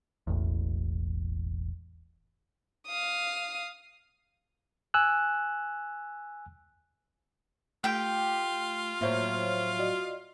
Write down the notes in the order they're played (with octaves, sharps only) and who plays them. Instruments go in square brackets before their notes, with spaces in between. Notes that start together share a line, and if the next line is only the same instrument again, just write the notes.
[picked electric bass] E1 A1 E2
[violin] F5 D#6
[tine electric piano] G#5 E6 F#6
[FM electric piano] A3 [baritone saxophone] F4 [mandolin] G4 G5
[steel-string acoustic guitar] A2 F3 F#3 [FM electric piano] A#3 C5 C#5
[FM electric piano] F#4 D5 D#5